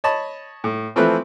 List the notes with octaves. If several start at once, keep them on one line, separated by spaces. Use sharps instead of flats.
C#5 D#5 A5 B5
A2
E3 F3 A3 C4 B4